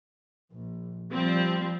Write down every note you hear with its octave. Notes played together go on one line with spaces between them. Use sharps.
A#1
F3 G3 C4